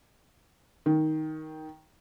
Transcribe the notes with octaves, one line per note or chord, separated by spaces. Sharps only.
D#3